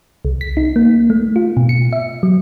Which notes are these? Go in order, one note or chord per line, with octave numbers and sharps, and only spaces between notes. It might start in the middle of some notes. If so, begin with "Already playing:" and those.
C2
B6
D#4
A#3
A3
F4
B2
C#7
E5
F#3